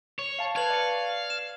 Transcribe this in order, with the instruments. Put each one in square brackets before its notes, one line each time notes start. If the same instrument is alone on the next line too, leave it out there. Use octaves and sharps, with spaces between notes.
[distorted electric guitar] C#5
[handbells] F5 A5
[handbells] B4 C#6 [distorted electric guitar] F5 [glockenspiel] G#6 F#7
[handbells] D5 C#7
[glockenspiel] E7